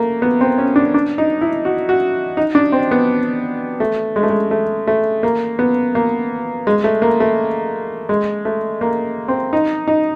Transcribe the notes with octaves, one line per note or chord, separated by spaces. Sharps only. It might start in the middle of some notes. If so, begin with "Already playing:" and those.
Already playing: A3 A#3
B3
C4
C#4
D4
D4
D#4
E4
F#4
F#4
D#4
D4
C4
B3
A3
G#3
A3
G#3
A3
A3
A#3
B3
A#3
G#3
A3
A#3
A3
G#3
A3
A#3
C4
D#4
D#4